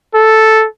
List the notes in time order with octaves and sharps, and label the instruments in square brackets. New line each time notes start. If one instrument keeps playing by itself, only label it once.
[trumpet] A4